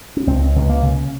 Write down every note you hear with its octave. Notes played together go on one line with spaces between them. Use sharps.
C#4
C#2 C4
C#2
A#3
C#3